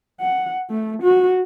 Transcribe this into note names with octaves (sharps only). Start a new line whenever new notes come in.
F#5
A3
F#4